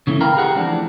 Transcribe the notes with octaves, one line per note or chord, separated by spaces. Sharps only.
C#3 E3 A3
A#4 B4 F5 G5 A#5
G4 G#4 F#5 G5 A#5
E3 F3 A3 C4 D4